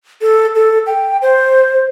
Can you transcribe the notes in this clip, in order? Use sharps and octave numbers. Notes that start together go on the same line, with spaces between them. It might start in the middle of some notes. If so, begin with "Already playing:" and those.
A4
A4
G5
C5